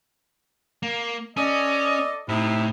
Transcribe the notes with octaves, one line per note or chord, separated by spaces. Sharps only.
A#3
C#4 A4 D5 D#5
A2 C3 D#4 E4